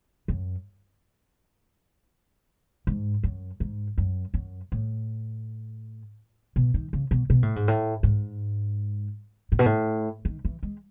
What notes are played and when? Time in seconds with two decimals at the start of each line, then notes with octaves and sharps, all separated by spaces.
0.28 F#2
2.87 G#2
3.23 F#2
3.60 G#2
3.98 F#2
4.34 F#2
4.72 A2
6.56 B2
6.74 D#3
6.93 C#3
7.11 B2
7.30 B2
7.43 A2
7.56 G#2
7.68 A2
8.03 G#2
9.52 A2
9.59 B2
9.66 A2
10.25 D#3
10.45 E3
10.63 G#3